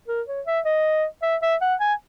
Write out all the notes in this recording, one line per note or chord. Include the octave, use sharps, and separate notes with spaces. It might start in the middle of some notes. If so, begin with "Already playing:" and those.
A#4
C#5
E5
D#5
E5
E5
F#5
G#5